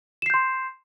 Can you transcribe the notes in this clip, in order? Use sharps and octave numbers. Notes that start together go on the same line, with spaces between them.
C6 G6 C7 E7